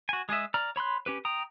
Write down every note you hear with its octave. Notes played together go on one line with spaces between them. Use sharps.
F#4 G#5
G#3 G#4 D#5 E5
D5 A#5 F6
C#5 B5 C6 F#6
C#4 G4 B4
G5 A#5 D#6